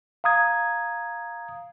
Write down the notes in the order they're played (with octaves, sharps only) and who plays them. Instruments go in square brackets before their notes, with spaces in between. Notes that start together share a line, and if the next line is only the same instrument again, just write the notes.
[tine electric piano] F5 A#5 D#6 G#6